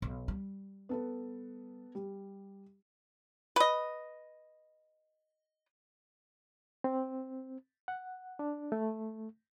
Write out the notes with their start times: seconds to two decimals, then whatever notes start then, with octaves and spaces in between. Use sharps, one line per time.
0.02 B1
0.28 G3
0.89 B3 A4 B4
1.95 G3
3.56 B4 D#5
6.84 C4
7.88 F#5
8.39 D4
8.72 A3